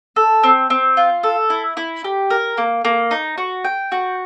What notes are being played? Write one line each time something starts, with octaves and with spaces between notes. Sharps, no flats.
A4
C4
C4
F4
A4
E4
E4
G4
A#4
A#3
A#3
D#4
F#4
G5
F#4